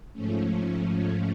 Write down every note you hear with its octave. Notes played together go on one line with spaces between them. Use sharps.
G#2 F3 A3 C#4